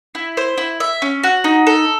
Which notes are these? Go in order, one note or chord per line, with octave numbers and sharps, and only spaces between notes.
E4
C5
E4
E5
C#4
F#4
D#4
A4